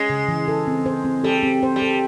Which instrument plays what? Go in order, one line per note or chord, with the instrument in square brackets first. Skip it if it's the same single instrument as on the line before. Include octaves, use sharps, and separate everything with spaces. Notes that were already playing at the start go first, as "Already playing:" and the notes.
Already playing: [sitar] G#3 [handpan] C#4
[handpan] C#3
E3
A4
C4
C5
C4
[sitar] G3 [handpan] A4
[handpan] C4
C5
[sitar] G3
[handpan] A4